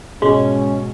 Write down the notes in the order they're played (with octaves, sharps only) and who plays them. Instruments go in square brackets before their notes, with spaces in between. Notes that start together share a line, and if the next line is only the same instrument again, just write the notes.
[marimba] G#2 [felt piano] B2 [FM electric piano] G#3 [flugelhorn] C#4